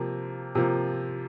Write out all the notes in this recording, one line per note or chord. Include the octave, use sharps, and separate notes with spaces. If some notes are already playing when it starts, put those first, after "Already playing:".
Already playing: C3 F3 A#3
C3 F3 A#3